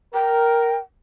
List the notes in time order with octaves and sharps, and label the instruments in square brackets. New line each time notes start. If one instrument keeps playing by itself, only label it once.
[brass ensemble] A#4 [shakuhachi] G5